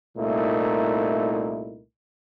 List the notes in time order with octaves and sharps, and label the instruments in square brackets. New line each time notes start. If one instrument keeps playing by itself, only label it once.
[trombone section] C2 A#2 A3 D#4 E4 A#4